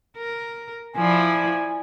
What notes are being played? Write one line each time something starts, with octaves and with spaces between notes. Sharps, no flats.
A#4
F3 E4 D5 G#5